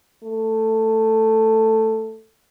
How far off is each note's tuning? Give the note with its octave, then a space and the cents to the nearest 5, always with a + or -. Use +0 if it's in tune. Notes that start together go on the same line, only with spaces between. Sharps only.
A3 +10